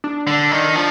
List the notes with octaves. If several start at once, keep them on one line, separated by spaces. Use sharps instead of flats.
D4
D3
D#3
F3